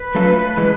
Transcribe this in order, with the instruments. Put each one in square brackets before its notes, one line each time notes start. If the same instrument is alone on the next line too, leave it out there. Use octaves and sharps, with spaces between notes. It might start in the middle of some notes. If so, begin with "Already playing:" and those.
Already playing: [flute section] B4
[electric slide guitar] F#3 A3 C#4 F4 A4
E3 G#3